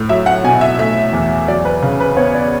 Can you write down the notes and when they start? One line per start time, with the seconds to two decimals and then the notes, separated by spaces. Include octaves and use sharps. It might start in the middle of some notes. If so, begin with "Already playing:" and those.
Already playing: A2
0.09 F#3 E5
0.26 F#5
0.44 B2 G#5
0.61 E5
0.78 A3 E5
1.13 E2
1.48 F#3 D5
1.65 B4
1.82 C#3
2.00 B4
2.17 B3 C#5
2.35 D5